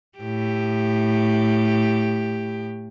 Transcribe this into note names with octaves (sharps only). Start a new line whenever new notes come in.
A2 G4